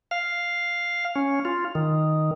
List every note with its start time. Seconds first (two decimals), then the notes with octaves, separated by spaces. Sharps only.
0.11 F5
1.16 C#4
1.45 F4
1.75 D#3